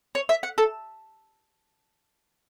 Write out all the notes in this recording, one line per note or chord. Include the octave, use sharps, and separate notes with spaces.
C#5
E5
F#5
A4